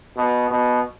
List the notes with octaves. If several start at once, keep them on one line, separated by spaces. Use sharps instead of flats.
B2
B2